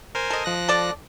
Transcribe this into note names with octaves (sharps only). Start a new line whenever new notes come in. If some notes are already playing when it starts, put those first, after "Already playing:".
A#4 C5 G#5
A4 D#5
F3 F#6 A#6
A4 D5